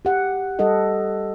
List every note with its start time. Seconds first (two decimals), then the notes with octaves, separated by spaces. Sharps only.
0.05 G4 F#5
0.59 G3 A4 D#5 F#5